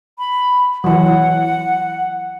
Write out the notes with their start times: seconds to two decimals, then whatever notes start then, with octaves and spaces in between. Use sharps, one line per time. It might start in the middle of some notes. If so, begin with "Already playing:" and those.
0.19 B5
0.84 E3 F#3 F#5